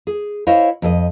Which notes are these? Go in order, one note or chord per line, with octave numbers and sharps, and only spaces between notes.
G#4
E4 C5 C#5 D#5 F5
F2 A4 D#5